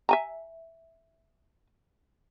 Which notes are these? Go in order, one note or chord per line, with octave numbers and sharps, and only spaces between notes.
E5 G#5 A#5